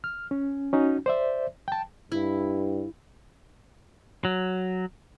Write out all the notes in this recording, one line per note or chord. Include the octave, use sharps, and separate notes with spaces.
F6
C#4
C#4 D#4 F#4
C5 D5 E5
G5 A5
G2 E4
F#3